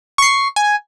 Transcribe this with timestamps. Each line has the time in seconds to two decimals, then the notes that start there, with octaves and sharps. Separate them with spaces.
0.18 C#6 C7
0.56 G#5